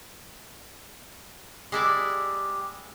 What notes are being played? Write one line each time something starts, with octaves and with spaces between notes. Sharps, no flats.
G#3 E4 G4 D5